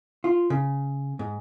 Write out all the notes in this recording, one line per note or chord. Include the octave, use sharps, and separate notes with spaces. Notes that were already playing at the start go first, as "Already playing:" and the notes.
F4
C#3
G#2